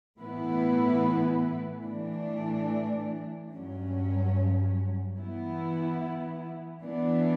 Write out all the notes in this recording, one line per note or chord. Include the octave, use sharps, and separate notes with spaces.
A2 E3 B3 E4 B4
A2 E3 A3 D4
G2 F#3 C#4
E3 B3 E4
E3 B3 D4